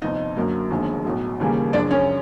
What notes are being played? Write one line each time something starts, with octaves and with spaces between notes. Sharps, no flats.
G1 F2 C3 D#4 D#5
F#2 D3 F#3 A#3
E1 D#2 D3 F3 G#3
B1 A2 F#3
D#2 C#3 E3 G3 A#3
F#2 C#3 F3 D4 D5
C#4 C#5